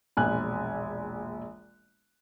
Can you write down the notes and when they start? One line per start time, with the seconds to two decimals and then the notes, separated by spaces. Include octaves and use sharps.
0.17 E1 A#1 G#5 F#6